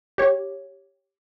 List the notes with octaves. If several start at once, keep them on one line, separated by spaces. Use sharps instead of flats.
G4 C#5